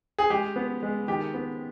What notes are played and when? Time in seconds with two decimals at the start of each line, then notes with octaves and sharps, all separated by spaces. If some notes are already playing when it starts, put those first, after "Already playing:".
0.19 G#4
0.30 G#3 G4
0.56 B3
0.83 G#3
1.08 D#3 G4
1.34 B3